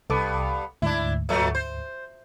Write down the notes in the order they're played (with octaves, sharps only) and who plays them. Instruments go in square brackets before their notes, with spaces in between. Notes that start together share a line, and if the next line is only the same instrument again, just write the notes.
[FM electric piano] C2 A4 D6 [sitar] G2 B3
[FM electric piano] D2 G#2 [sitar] D4 E4
[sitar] A#2 F#3 A3
C5